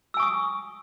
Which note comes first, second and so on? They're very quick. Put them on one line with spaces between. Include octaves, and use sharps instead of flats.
E6 G#5 C#6 D#6